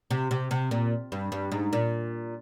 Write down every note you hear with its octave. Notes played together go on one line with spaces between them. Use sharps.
C3
C3
C3
A#2
G2
G2
G#2
A#2